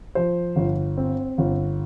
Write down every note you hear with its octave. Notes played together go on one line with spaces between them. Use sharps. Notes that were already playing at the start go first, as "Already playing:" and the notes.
F3 C5
G1
C4
G1